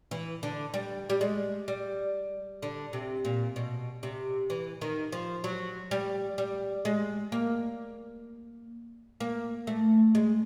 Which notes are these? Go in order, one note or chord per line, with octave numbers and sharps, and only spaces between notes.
E3
D3
G3
G3
G#3
G3
D3
C3
A#2
B2
C3
E3
D#3
F3
F#3
G3
G3
G#3
A#3
A#3
A3
G#3